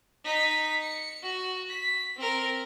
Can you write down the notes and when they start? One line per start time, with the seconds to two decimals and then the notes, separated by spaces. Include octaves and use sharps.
0.25 D#4 B6
0.82 C#7
1.23 F#4
1.70 B6
2.17 C4 A#4